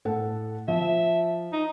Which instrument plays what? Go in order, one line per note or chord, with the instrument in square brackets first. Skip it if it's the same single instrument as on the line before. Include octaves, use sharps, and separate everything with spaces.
[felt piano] A2 A4 F#5
[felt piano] F3 [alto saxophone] E5
[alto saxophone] D#4